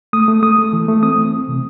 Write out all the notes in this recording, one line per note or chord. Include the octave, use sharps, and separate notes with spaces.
A3 D#6
A3
A3 D#6
A3
E3
A3
C4 D#6
E3
C4
C3